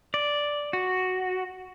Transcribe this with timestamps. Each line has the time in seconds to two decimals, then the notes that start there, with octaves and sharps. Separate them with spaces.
0.14 D5
0.73 F#4